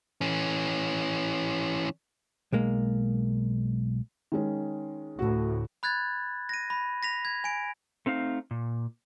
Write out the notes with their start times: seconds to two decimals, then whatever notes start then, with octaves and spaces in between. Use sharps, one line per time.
0.21 E3 C#4
2.53 B1 G#3 A#3
4.32 D#3 G#3 C#4
5.19 D2 A2 F#4
5.83 B5 F#6 G#6 A6
6.49 A#6 D#7
6.70 B5
7.03 A#6 B6 F7
7.25 G#6
7.44 G#5 D7
8.06 A3 C4 D#4 F5
8.51 A#2